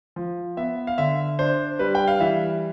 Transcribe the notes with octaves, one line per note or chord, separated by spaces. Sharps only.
F3
B3 E5
F5
D3 E5
D4 C5
G3 B4
G5
F5
E3 E5